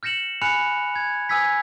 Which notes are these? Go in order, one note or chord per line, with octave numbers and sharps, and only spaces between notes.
F6 G6 A#6 C#7 E7 F#7
G#5 B5 F6 F#6 C#7 F7
G#6
G#5 D#6 E6 G#6 B6